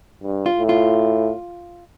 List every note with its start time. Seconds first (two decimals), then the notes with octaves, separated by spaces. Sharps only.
0.23 G2
0.46 F4
0.58 A2
0.69 F4